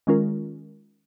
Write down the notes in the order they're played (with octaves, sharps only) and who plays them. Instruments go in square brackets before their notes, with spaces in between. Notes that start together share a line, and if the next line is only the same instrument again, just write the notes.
[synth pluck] D#3 G#3 C#4 F4 A#4